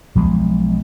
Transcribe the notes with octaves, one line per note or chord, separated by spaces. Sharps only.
B1 F3 G#3